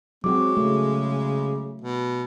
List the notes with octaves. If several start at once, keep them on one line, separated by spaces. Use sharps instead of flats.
F#3 G#3 C4 F#4 D6
C#3 A3
B2